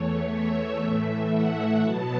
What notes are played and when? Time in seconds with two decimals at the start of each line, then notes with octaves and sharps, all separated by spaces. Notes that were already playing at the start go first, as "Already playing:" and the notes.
Already playing: E2 E3 A3 C#5
0.34 E5
0.84 A2 E3 A3
1.34 F#5
1.83 B2 F#3 B3 A5